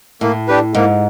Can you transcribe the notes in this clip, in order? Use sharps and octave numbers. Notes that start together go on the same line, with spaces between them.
A2 A#3
D4 G4 B4
G#2 A#3